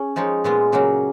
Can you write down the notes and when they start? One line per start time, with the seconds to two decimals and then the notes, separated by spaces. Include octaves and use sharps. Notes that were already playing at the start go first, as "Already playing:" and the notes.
Already playing: C#4 G#4
0.16 F3 G#3 D#4 A#4 C#5
0.44 A#2 G#3 B3 F4
0.72 C#3 F#3 A#3 C#4